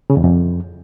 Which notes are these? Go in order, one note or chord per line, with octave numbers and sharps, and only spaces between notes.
C#3
E2
F2